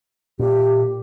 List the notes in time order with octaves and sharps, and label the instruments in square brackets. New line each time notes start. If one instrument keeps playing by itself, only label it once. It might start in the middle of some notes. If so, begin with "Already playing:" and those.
[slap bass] A#2 [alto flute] G4